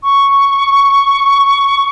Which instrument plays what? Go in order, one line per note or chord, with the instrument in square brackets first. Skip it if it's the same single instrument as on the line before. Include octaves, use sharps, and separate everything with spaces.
[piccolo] C#6